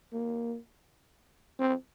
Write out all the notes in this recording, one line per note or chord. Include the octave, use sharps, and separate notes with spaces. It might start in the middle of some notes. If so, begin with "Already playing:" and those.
A#3
C4